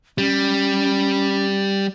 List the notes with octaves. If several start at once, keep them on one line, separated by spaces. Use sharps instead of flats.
G3 C#4